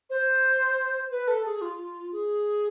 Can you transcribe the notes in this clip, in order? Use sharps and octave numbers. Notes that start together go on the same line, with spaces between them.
C5
B4
A4
G#4
G#4
F4
G#4